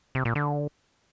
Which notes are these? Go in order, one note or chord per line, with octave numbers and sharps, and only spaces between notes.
C3
A#2
D3